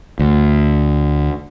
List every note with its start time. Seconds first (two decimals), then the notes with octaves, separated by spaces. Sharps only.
0.19 D2